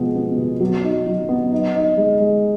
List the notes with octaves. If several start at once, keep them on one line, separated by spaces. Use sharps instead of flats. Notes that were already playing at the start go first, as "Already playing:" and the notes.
Already playing: B2 F3 G#3 B3
B3
B2
F#3
D#4
F#3
B3
D#4
D#4
G#3
G#3